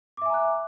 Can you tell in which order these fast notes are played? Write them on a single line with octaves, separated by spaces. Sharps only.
D6 E5 G#5 A#5 F#6